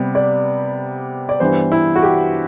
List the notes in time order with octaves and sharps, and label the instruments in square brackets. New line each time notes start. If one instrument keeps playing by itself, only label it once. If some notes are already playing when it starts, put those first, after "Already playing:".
Already playing: [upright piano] C3 G3 B3
D5
D5
G2 E3 G3 B3 C5
E4
F#4
G4